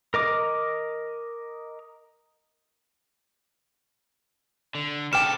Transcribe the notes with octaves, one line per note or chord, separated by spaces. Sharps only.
A#4 D#5 D6
D3
C#3 A4 G5 D6 F6 E7